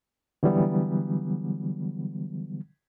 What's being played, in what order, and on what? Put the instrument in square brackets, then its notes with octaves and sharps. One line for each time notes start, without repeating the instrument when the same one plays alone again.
[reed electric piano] D3 E3 F#3 G3 B3